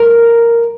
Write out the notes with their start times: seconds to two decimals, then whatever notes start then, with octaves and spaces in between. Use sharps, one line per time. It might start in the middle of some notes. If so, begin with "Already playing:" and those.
Already playing: A#4